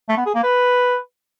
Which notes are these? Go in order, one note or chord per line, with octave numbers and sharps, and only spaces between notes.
A3
B3
G#4
A#3
B4